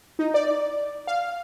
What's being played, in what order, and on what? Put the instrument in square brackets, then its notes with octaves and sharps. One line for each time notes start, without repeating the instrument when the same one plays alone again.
[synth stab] D#4
D5
F5